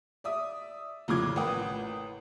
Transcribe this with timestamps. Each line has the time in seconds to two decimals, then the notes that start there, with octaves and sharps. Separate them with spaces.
0.24 D5 E5 D#6
1.08 F1 A2 C#3 F3 D6 G#6
1.36 A1 A#3 B4 F#5 G5 D#6